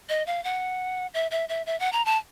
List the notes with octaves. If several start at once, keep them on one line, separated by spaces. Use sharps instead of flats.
D#5
F5
F#5
E5
E5
E5
E5
F#5
A#5
A5